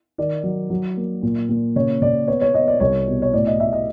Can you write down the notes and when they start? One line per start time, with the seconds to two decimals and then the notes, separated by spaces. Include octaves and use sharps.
0.18 D#3 D5
0.43 F#3
0.70 F#3
0.97 A#3
1.23 A#2
1.49 A#2
1.76 C#3 C#5
2.02 C#3 D5
2.28 B3 C#5
2.41 C#5
2.54 B3 D#5
2.68 D5
2.80 C2 C#5
3.07 B2
3.22 C#5
3.33 A2 D5
3.47 D#5
3.60 A2 E5
3.73 D#5